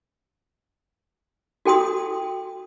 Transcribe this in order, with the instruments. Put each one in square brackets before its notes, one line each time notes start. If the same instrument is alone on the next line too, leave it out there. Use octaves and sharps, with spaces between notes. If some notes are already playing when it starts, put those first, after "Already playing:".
[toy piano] F#4 A4 G5 C6 D#6